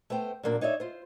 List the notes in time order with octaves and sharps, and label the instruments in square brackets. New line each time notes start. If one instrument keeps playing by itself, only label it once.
[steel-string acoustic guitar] A3 B3 C5 G5
A#2 F#3 A#3 D4
D#4 C#5 D5 E5
F4 C5